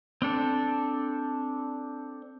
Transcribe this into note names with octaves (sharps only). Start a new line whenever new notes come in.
C4 D4 A4